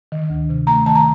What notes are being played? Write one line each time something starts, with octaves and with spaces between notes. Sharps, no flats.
D#3
D2
C3
A3 A#5
D#3 A5
A#5